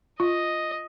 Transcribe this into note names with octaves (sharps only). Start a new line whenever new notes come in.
F4 D#5